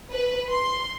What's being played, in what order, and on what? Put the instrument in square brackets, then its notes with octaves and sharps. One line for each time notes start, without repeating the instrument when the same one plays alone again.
[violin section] B4
C6